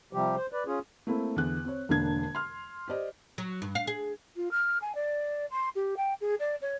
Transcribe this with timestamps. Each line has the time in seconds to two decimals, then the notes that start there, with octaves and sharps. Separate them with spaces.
0.13 C3 F3 G3 G4
0.36 C5
0.52 B4 D5
0.66 C#4 F4 G#4
1.07 A3 A#3 C4 E4
1.36 E2 D3 B3 F#6
1.65 C4 C#5
1.89 E1 D3 A#3 D4 G#6
2.35 C6 F6
2.88 G4 C5 D5 D#5
3.38 F#3
3.62 G2
3.75 F5
3.87 G#4
4.36 F4
4.51 F6
4.82 G#5
4.95 D5
5.51 C6
5.75 G4
5.97 G5
6.21 G#4
6.39 D5
6.62 C#5